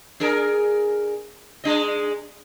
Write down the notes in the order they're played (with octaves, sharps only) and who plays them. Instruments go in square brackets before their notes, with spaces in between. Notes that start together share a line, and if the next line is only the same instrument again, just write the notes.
[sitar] D4 G#4 A#4
G#3 D4 D#5